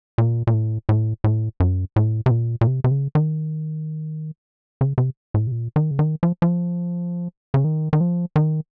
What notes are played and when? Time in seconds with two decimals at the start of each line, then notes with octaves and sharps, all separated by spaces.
0.18 A#2
0.47 A#2
0.53 A2
0.89 A2
1.24 A2
1.60 F#2
1.96 A2
2.26 C3
2.31 A#2
2.61 A#2
2.67 C3
2.84 C3
2.91 C#3
3.15 D#3
4.81 C#3
4.98 C3
5.34 A2
5.47 C3
5.52 A#2
5.76 D#3
5.91 C#3
5.99 D#3
6.23 F3
6.42 F3
7.54 C#3
7.64 D#3
7.93 D#3
8.01 F3
8.36 D#3